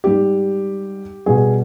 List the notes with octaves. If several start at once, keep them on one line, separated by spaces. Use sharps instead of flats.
G#2 G3 G4
B2 G3 G#4